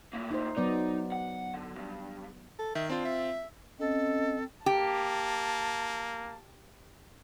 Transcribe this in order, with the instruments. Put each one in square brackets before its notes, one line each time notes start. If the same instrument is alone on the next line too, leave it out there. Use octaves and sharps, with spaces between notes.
[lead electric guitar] A2 A#3
[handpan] D#4 C5
[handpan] F#3 B3 D5 [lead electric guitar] D#4
[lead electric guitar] F#5
D3
B1 G2
[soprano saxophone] A4
[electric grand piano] D#3 [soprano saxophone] E5
[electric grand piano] C4 F4 [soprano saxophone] D4
[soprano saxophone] E5
[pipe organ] C4 [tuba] C#4 [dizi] A4 [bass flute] D#5
[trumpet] A#3 [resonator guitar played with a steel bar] G4 [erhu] A5